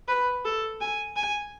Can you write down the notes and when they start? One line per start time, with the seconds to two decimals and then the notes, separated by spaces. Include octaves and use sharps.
0.08 B4
0.45 A4
0.81 G#5
1.16 G#5